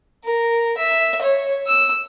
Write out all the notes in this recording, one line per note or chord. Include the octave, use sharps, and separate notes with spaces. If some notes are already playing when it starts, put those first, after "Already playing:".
A#4
E5
C#5
E6